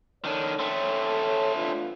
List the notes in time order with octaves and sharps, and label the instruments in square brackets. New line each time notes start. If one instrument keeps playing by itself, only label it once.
[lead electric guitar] D#3 D4 [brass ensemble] A4 C#5
[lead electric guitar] A3 C4
[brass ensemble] B3 D4 F4